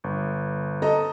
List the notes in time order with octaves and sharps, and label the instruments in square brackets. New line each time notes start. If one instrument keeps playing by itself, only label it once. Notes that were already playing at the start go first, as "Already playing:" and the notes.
[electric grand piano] G1
[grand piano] A4 D#5 A#5